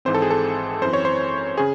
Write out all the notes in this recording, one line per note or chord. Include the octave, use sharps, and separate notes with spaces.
G#1 G#2 E3 C4 C5
A4
G#4
A4
F#2 E3 C4 C5
C#5
C5
C#3 G#4